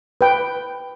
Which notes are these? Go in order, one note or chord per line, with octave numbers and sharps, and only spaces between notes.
B4 G5